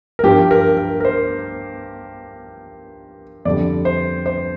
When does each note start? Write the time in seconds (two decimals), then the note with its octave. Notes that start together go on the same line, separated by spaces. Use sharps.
0.19 A#4
0.23 G2 F3 G4
0.51 A#4
0.77 A#4
1.00 A#4
1.05 C5
3.45 F2 D3 G3 D5
3.85 C5
4.26 C5